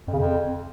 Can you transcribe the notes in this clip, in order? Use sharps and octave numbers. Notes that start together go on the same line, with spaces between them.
F2
C#3
F2